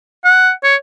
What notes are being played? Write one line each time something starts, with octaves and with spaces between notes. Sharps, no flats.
F#5
C#5